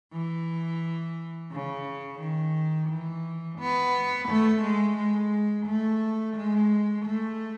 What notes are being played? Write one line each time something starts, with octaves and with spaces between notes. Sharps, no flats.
E3
C#3
D#3
E3
B3
A3
G#3
G#3
A3
G#3
A3